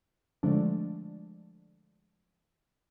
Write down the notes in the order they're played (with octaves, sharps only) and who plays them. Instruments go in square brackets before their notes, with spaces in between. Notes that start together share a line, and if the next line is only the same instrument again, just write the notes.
[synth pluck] D3 F3 G#3 A3 D4